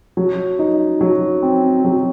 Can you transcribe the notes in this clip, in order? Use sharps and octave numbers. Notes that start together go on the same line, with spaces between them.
F#3
D#4
F#3
C4
F#3